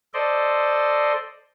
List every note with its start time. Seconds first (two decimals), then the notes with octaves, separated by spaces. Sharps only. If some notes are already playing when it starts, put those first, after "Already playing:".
0.14 A4 C5 D5 D#5 C6